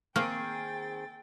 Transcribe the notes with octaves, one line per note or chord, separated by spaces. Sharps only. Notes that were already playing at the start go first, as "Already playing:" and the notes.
D#3 A#3 C4 G#4 G5 A6